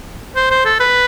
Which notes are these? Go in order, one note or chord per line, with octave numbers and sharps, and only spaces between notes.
C5
C5
A4
B4